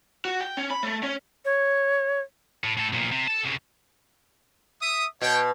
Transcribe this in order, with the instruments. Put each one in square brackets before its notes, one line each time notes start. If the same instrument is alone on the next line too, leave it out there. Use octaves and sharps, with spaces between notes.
[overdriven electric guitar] F#4
G5
C#4
B5
A3
C#4
[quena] C#5
[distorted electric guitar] A2
A2 A4
B1 A#2
C3
A4 A5
C2 C#3
[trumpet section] E5 D#6
[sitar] B2 [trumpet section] C#5 G5